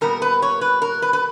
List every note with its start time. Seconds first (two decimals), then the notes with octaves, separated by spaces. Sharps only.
0.01 A#2 G3 B3 A#4
0.22 B4
0.42 C#5
0.61 B4
0.82 A#4
1.02 B4
1.13 B4